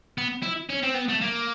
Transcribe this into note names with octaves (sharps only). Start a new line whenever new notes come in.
B3
E4
C#4
C4
B3
A3
A#3